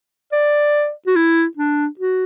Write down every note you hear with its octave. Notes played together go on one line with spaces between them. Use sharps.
D5
F#4
E4
D4
F#4